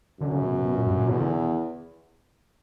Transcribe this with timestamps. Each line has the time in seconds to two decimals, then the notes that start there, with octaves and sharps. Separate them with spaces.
0.20 F#2 D3
0.32 C#3
0.43 B2
0.53 B2
0.66 B2
0.76 A#2
0.87 G2
0.98 A#2
1.09 E2 B2
1.20 D3